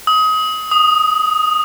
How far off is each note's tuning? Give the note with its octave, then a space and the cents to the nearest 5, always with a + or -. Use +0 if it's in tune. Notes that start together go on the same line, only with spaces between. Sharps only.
D#6 +25
D#6 -10